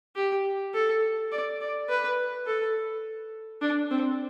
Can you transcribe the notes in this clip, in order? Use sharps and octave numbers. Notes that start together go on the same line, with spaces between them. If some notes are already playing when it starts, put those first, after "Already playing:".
G4
A4
D5
D5
B4
A4
D4
C4